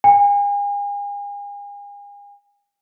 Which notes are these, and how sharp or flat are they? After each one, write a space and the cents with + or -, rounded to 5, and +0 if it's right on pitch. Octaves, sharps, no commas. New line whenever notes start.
G#5 -40